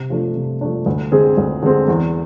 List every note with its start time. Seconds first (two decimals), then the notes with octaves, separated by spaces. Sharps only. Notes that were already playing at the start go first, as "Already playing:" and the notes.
Already playing: C3
0.10 F3 A3 D4
0.35 C3
0.61 F3 A3 D4
0.86 D2
1.12 D3 G#3 C4 G#4
1.38 D2
1.63 D3 G#3 C4 G#4
1.88 E2